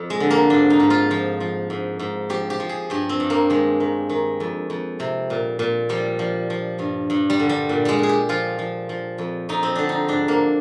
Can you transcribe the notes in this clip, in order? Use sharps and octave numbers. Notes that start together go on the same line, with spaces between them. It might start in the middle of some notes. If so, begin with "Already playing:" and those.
Already playing: F2
G#3
D3
A#3
G#2 D4
D#4
G#2
F4
F3
F3
G#2
G#2
F3 G4
G4
F3
G#4
G2 G4
C4
G2
A#3
D#3 G#3
D#3
D#3
F2
F2
C3
A#2
A#2
F3 G3
F3
F3
G2
G2
G3
D3
G3
A#2
G3 G#3
A#2 G#4
G4
F3 F4
F3
F3
F2
F2 D#4
C4
D3 D4
D#4
G#2 D4
A#3